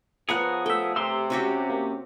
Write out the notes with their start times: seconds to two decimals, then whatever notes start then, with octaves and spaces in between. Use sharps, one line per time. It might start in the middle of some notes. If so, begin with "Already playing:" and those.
0.29 F3 B3 G#4 A#4 C#5 F#5 F#6
0.66 A3 E5 G5
0.96 C3 G4 C6 E6
1.30 C4 C#4 F#4 G4
1.70 A#3